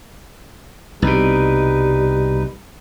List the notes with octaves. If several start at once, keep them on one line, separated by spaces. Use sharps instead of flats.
C2 B2 G3 D#4 B4